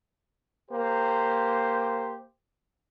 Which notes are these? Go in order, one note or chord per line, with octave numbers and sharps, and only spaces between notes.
A#3 G4 C5